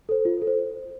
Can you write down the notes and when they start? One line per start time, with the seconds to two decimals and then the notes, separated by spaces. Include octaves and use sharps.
0.09 A4 C5
0.25 F4
0.42 A4
0.47 C5